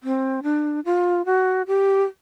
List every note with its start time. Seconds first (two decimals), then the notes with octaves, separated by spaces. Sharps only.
0.03 C4
0.43 D4
0.85 F4
1.25 F#4
1.67 G4